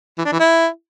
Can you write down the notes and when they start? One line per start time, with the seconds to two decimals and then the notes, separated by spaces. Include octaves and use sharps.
0.18 E3
0.25 D4
0.32 E3
0.39 E4